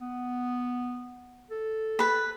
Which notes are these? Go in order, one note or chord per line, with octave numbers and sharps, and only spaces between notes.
B3
A4
B4 B5